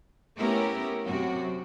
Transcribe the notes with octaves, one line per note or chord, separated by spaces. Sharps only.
A3 B3 C#4 E4 G4 A#4
F#2 C3 F#4